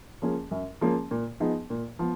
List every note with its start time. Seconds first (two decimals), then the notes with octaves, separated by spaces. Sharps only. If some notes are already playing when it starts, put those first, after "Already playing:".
0.22 F3 A#3 C#4 G#4
0.51 F#2
0.81 F3 A#3 C#4 G#4
1.11 A#2
1.40 F3 B3 D#4 G#4
1.70 A#2
1.99 F3 B3